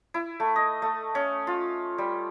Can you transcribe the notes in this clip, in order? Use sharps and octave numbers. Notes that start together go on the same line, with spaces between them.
E4
A3
D#5
A3
C#4
F4
G3